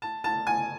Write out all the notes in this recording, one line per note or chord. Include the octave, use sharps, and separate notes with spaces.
A5
A5
G#5